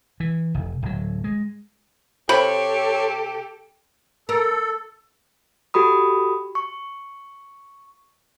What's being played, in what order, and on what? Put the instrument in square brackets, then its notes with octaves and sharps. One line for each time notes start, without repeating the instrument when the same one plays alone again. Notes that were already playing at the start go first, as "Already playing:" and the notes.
[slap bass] E3
F1
D1 F#3
G#3
[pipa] C3 B5 [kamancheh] G4 A4 [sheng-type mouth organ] C#5 C6
[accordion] A4 [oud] A#4
[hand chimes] F#4 G4 A4 B5 D#6
C#6